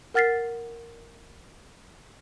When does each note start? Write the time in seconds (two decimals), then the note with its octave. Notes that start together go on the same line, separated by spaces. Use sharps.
0.14 A#4 F#5 F6 A6 B6 C7